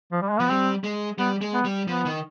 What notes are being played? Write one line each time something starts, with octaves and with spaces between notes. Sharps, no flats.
F3
G3
G#3
F3 B3
G3 C4
G#3
G3 B3
G#3
B3
G3
F3 B3
D#3